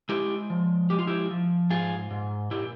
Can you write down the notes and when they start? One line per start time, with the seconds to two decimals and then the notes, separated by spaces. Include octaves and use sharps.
0.09 G#3 E4 G4
0.50 F3
0.90 G#3 G4
0.99 F4
1.07 E4 G4
1.31 F3
1.70 G#2 F4 G#4
2.11 G#2
2.51 A#2 E4 G4